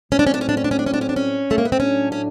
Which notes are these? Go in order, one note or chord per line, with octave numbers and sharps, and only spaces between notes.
A2 F#3 A3 C4 C#4
D4
C#4
D4
C#4
D4
C#4
D4
C#4
D4
C#4
D4
C#4
D4
C#4
A3
A#3
B3
C4
A2 F#3 A3 C#4 D4
C#4